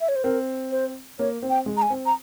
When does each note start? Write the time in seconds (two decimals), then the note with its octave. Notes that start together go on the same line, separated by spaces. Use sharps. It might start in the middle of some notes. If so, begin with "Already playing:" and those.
0.01 E5
0.09 C#5
0.16 C5
0.24 C4 A#4
0.71 C5
1.19 A#3 C#5
1.42 C4
1.50 G5
1.66 G#3
1.77 A#5
1.82 G#5
1.90 C4
2.06 A#5